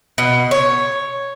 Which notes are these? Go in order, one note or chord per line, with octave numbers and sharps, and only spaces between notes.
B2
C#5